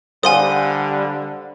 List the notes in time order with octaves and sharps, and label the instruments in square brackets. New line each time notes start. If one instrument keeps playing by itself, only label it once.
[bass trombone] D3 [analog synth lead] G3 [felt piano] C5 F5 F#5 [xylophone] G#5 C6 D#6